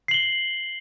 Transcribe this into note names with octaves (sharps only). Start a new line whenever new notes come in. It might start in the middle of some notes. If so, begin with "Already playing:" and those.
C7 F#7 G7